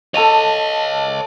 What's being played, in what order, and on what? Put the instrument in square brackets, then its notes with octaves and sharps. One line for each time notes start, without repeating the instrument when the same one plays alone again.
[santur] A4 C#6 [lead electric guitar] C#5 D#5 [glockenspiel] A5 D#7 F7